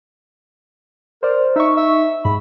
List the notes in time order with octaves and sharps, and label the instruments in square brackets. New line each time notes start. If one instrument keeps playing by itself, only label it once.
[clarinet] A#4 [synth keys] C5 D5
[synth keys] D#4 C#6 [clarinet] E5
[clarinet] E5
[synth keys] G#2 [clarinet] B5